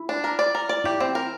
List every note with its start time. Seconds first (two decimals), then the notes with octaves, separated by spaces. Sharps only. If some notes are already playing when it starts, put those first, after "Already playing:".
Already playing: E4
0.09 D4
0.24 A#4
0.39 D5
0.55 A#4
0.69 D5
0.84 E4 G4
1.00 C4
1.15 A#4